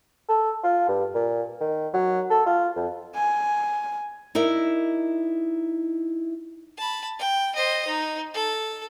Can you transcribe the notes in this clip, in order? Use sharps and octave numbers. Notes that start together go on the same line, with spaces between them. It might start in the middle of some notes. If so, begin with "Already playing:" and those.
A4
F4
G2
A#2
D#3
F#3
A4
F4
F2
G#5
D#4 E4 A#4 D5 E5
A5 B5
G5
C5 D#5
D#4
A4